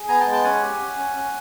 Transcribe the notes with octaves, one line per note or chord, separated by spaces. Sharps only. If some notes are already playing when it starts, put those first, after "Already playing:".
Already playing: G#4
B3 G#5 A#5
G5 A5
G#3
G5 A5
C#4 F#5 G#5
G4
C#4
C#4
C#4